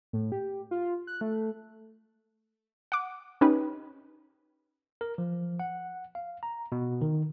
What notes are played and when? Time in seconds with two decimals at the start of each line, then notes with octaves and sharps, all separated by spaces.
0.13 A2
0.32 G4
0.71 F4
1.07 F#6
1.21 A3
2.92 F#5 D6
3.41 C#4 D#4 G4 B4
5.01 A#4
5.18 F3
5.60 F#5
6.15 F5
6.43 A#5
6.72 B2
7.01 D#3